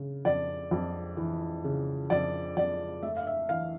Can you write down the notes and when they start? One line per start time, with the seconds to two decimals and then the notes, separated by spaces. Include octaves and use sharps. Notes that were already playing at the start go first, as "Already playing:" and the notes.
Already playing: C#3
0.25 F2 D5
0.71 F2
1.17 E3
1.64 C#3
2.10 F2 D5
2.57 F2 D5
3.03 A3 E5
3.17 F5
3.27 E5
3.49 E3 F5